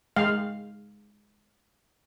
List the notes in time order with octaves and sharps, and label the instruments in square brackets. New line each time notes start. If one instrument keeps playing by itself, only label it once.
[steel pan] G#3 F5